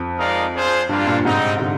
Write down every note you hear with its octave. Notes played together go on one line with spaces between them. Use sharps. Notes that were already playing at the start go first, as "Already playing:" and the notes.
Already playing: F2
G#3 D#4 A#4 D5 F5
D4 F4 G#4 C5
G2 G3 A#3 D4 F4
G2 A#2
G#2 C3 G3 C4 D#4
D3
C3